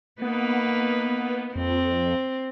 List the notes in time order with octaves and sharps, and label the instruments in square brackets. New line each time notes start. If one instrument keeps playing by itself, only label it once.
[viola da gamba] A#3 D#4 B4 [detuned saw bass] B3
[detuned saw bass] F2 [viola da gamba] C4